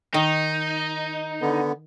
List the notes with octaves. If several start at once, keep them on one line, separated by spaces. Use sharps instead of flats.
D#3 D#4
D3 B3